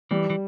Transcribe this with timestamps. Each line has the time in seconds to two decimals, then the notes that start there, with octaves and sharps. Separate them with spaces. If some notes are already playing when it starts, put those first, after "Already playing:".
0.11 E3 G3
0.30 E3